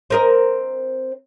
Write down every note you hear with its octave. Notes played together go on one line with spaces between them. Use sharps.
C4 A#4 D#5